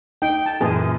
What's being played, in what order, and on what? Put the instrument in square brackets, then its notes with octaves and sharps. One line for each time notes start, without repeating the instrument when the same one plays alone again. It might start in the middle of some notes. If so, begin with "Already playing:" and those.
[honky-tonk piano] D#4 [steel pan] G5
[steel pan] A5
[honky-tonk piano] F#2 A#2 E3 [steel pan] G#4